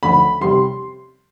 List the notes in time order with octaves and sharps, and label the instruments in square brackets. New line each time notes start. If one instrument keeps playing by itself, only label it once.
[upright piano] D2 B5
C3 G3 C6